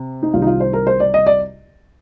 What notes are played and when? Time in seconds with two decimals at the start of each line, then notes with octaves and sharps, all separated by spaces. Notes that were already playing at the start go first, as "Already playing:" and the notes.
Already playing: C3
0.23 D#4
0.34 C2 C3 D#3 G3 F4
0.42 D#4
0.47 F4
0.60 C5
0.73 A#4
0.87 C5
1.00 D5
1.14 D#5
1.26 D5